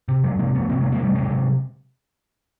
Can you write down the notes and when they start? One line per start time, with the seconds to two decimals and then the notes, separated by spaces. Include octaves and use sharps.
0.08 C3
0.23 F2 F#3 G#3
0.39 C3 G#3 A#3
0.54 F2 A3 B3
0.69 C3 A#3 C4
0.80 G#3 A#3
0.85 E2
0.92 G#3 A#3
1.00 C3 G3 A3
1.15 E2 F#3 G#3
1.31 C3